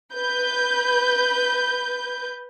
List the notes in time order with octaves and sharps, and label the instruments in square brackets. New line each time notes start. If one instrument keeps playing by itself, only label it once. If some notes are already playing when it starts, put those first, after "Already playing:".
[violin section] B4 G6